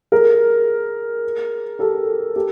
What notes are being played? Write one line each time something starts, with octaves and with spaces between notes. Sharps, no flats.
G#4 A#4
G4 A4
G4 A4